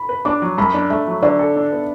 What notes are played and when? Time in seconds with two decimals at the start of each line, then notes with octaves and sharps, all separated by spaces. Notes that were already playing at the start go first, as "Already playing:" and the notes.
Already playing: B5
0.09 B4
0.25 D4 D6
0.42 F#3
0.58 F#2 B5
0.74 D4
0.90 A3 E5
1.07 F#3
1.23 D3 D5
1.39 A4
1.56 D4
1.72 B3